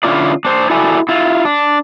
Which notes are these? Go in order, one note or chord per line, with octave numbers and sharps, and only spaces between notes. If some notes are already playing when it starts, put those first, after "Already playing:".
D3 C#4 E4 F4 D5
D4 C5
E4 F#4 A4 D5 E5 G#5
E4 F4
D4